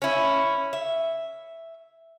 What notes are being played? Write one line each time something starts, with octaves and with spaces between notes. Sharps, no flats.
C#4 E4
E5